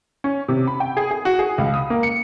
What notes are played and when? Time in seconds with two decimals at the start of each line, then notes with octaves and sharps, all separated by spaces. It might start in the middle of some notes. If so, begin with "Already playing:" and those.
0.24 C#4
0.48 C3
0.67 B5
0.80 G5
0.97 G#4
1.11 G#4
1.25 F#4
1.39 G#4
1.58 C#2
1.74 D#6
1.90 A#3
2.03 C#7